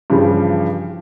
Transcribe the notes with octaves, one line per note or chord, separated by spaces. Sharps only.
G2 C#3 E3 F3 G3